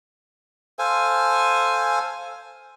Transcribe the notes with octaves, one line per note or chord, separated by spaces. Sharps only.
A4 C5 F5 G#5